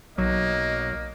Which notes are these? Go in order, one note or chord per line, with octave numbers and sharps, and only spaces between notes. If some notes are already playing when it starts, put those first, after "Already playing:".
B1 F#3 A#3 D#5